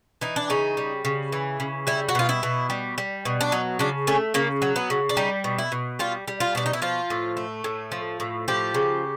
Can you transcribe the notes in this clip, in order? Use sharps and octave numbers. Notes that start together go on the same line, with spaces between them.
E3 D#4
D4
C#3 D#4
G3
C#3
E3
C#3
G3 E4
F#4
B2 F4
E4
B2
G3
G3
B2
D4
F#3 D#4
C#3 D4
A3 C#4
C#3 A#3
F#3
B3
C#3
D4
G3 D#4
B2
E4
B2
G3 F4
G3
F4
B2 D4
D#4
E4
F3 F4
A2
A3
A2
F3
A2
F3 G4
C#3